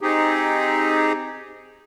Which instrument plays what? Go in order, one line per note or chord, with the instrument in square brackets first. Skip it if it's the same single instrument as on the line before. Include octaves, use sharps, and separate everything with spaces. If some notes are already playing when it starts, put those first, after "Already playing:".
[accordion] C4 D#4 G4 G#4